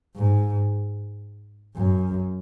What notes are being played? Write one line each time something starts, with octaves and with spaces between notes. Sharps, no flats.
G#2
F#2